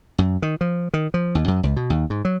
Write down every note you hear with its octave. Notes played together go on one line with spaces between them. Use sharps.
F#2
D#3
F3
D#3
F3
D#2
F#2
C#2
B2
D#2
G#2
F#3